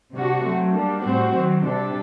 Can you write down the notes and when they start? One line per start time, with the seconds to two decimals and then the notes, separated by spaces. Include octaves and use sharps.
0.14 C3 G3 D4 F#4
0.44 F#3 A3 C4
0.74 G3 A#3 D4
1.03 A2 G3 C4 F#4 C5
1.33 D#3 F#3 C4
1.63 C3 G3 D4 A4